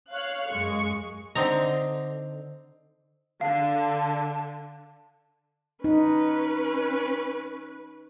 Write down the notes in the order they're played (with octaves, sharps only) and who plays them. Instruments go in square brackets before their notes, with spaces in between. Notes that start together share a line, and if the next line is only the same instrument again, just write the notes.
[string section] C#5 F5 F#6
F#2 G#3 C#6
[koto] D3 C4 D#4 A#5
[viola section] D3 [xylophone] F5 [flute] A5
[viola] C#4 B4 [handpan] D#4